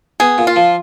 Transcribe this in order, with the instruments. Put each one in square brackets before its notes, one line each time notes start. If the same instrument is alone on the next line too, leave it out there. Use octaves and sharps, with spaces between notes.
[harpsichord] B3 [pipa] G#4
[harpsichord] A#2
[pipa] F4
[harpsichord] F3